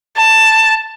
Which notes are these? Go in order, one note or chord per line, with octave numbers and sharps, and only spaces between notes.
A5